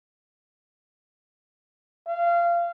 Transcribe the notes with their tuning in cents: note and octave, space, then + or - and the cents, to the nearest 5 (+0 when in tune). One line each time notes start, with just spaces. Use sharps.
F5 -25